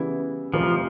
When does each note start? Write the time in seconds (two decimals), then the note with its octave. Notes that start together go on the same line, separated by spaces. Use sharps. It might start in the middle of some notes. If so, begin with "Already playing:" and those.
Already playing: C#3 E3 G3 B3 E4
0.54 F1 F2 C3 E3 F3